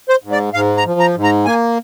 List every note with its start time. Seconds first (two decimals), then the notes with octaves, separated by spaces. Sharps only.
0.09 C5
0.24 G#2
0.32 D5
0.54 G#2 F5
0.77 A#5
0.85 F3
1.00 A#5
1.16 G#2
1.24 A#5
1.45 A#3 G#5